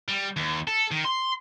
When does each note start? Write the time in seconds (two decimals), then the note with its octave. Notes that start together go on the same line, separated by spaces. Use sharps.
0.08 G3
0.36 D#2
0.67 A4
0.91 D#3
1.05 C6